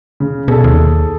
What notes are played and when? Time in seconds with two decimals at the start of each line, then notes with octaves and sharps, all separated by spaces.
0.20 C#3
0.48 B2 G#4 A4
0.64 D#2